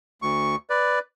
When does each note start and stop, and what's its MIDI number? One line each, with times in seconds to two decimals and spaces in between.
0.22 0.56 38
0.22 0.56 85
0.70 0.99 71
0.70 0.99 74